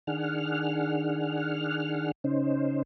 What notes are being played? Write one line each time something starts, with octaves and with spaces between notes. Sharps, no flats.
D#3 D4 G#4 F#5 F6
C#3 C#4 D#4 C5